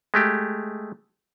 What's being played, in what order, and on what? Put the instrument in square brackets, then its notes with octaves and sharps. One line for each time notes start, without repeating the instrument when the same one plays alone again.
[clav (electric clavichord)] G#3 A3 G4